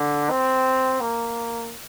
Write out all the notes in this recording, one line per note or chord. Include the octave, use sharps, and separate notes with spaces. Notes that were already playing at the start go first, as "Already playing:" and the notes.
Already playing: D3
C4
A#3